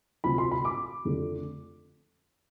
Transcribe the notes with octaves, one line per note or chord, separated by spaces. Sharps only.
D2 C3 F3 C4 B5
C6
B5
D6
F2 D3 A3